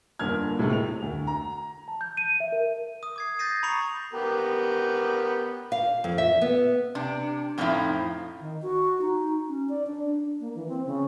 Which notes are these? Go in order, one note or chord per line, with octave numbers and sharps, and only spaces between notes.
G1 D3 A#3 F6 G#6
A2 C3 G#3 A3
F7
D2
A#5
A5
G6
D#7
E5
A#4
D#6
D6 G#6 C7
G6 A6 A#6 C7 D#7
A#5 B5 C#6 C#7 F7
B3 G4 A#4
F5
F2
E5
B3
C3 D4
F2 A2 F3 G#3 D#4 E4
D#3
F#4
D#4
C#4
D5
D4
A#3
E3
C4
C#3